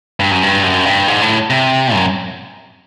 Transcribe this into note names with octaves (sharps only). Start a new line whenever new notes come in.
G2
F#2
G2
F#2
G2
G#2
A2
C3
F#2